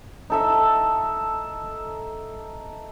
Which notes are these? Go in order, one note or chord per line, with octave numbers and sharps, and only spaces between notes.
D#4 A4 E5